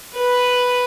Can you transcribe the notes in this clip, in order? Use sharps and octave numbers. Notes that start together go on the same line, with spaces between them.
B4